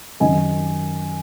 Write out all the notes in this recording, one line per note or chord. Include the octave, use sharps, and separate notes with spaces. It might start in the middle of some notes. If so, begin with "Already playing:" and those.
F#2 D#3 D#5 G#5